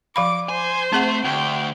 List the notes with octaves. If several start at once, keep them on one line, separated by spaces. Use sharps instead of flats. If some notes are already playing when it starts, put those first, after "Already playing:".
F3 F5 B5 D6
C5 G#5
A3 C4 G#4 F#5
D2 G5